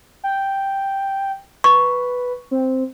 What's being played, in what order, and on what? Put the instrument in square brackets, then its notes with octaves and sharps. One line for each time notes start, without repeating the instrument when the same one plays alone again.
[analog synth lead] G5
[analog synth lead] B4 [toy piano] C#6
[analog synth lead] C4